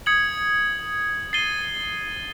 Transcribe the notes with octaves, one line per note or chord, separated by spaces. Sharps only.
D#6 G#6 C#7 F#7
A6 C7 D#7 G7